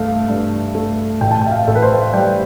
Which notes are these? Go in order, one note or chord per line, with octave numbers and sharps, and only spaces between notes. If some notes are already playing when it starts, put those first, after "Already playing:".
Already playing: G2 A3 F5
G2
A3
A1 G5
A5
G5
E5
F5
A1 A4
B4
C5
G3 G5